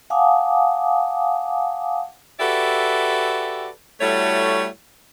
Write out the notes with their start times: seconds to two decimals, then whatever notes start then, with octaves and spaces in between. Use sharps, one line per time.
0.10 F5 F#5 G#5 A5 D6 D#6
2.40 F#4 G4 A4 B4 D5 E5
4.01 G3 A3 E4 F#4 A4 C#5